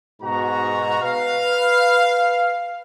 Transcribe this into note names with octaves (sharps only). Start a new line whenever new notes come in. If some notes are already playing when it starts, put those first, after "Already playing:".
G#2 B2 F#4 A#5
B4 F5